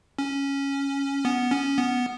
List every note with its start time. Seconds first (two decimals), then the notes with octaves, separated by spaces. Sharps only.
0.19 C#4
1.25 B3
1.51 C#4
1.78 B3